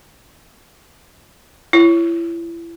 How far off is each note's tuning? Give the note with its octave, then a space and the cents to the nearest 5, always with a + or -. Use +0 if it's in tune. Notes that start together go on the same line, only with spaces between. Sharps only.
E4 +30 C#5 +0